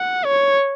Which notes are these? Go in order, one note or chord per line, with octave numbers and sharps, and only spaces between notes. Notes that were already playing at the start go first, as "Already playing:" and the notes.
Already playing: F#5
C#5